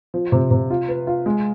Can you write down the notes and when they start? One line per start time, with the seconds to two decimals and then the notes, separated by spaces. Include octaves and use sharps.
0.14 F3
0.32 C3
0.51 C3
0.70 F4
0.88 B4
1.07 F4
1.26 G#3